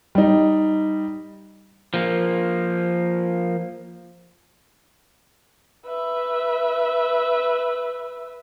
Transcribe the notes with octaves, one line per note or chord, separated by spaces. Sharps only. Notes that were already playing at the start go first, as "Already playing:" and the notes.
G3 D#4
F3 A#3
B4 E5